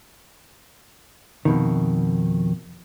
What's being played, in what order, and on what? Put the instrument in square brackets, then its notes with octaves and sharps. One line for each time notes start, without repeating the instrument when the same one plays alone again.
[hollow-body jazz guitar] F2 B2 D#3